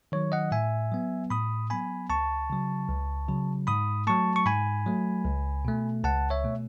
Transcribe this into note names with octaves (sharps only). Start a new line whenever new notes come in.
D#3 F#3 C#5
D#5 F#5
A2 E5 G#5
F#3 B3
A2 B5 D#6
F#3 B3 G#5 B5
C#2 A5 C#6
C#3 F#3
C#2
C#3 F#3
G#2 B5 D#6
F#3 A3 A5 C#6
C#6
G#2 G#5 B5
F#3 A3
C#2
B2 A3
C#2 F#5 A5
C#5 E5
B2 A3